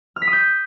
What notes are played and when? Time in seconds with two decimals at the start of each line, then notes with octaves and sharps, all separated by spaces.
0.16 F6
0.22 B6
0.27 D#6
0.33 G6